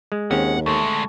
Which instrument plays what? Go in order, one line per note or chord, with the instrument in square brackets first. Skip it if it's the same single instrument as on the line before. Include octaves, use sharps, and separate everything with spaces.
[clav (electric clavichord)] G#3
[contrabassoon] D#2 [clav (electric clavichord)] G#3 C4 C#4 [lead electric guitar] F#5
[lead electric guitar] D2 G#3 [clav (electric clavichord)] A3 [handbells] A5 C#6